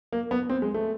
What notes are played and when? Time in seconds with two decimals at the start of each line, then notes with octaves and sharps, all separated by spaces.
0.12 A#3
0.31 B3
0.49 C4
0.62 G#3
0.74 A3